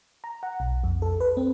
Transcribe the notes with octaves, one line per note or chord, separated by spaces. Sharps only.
A#5
F#5
B1
F2
A4
B4
C4